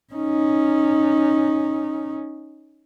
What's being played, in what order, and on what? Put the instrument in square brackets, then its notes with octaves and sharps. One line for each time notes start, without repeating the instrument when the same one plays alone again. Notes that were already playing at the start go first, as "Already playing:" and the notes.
[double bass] C#4 D#4